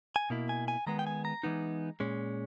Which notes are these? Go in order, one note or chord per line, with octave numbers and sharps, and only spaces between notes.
G#5
B2 A#3 E4
G#5
G#5
D#3 G#3 B3 A#5
G5
G#5
A#5
E3 G#3 B3 D#4
A#2 G#3 C#4